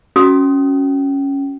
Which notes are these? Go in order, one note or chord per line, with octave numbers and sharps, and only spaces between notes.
C#4 F#4 D#6